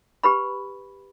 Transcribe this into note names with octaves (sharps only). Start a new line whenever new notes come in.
G4 B4 B5